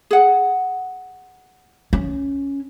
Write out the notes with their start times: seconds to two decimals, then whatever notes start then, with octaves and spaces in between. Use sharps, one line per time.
0.11 G#4 F#5
1.93 C#4